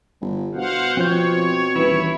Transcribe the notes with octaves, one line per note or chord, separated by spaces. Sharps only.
G1
B2 C5 F5 F#5
F3 C4 C#5 G6
D#1 E3 E4